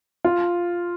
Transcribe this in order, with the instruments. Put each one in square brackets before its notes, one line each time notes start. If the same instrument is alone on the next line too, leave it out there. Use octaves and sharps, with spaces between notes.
[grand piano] F4